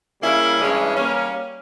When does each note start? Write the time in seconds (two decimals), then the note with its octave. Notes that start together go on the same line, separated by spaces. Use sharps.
0.21 C#3 G3 A#3 C#4 E4
0.60 G2 E3 G#3 C#4
0.97 G3 A#3 C#4